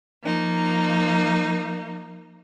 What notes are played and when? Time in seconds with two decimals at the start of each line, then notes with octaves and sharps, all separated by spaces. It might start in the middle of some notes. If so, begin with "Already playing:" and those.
0.23 F3 A#3 D#4